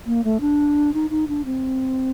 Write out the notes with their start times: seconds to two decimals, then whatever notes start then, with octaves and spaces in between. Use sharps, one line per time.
0.07 A#3
0.24 A3
0.41 D4
0.94 D#4
1.10 D#4
1.28 D4
1.45 C4